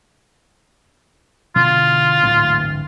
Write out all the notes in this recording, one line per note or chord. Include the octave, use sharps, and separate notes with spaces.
B2 D3 E3 F4
D1 A1 G#2